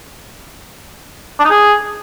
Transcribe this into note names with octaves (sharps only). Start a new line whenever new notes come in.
D4
D#4
G#4